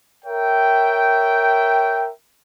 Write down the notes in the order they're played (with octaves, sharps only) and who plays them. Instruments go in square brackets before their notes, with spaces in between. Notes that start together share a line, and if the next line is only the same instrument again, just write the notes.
[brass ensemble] A#4 C#5 E5 G5